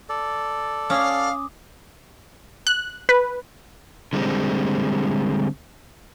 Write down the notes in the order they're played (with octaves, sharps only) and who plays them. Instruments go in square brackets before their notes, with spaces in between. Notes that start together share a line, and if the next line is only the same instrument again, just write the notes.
[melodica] A4 D5
[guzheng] C#4 [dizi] F5 [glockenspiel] D6 D#6
[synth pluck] F#6
B4
[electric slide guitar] D3 G3 G#3 C4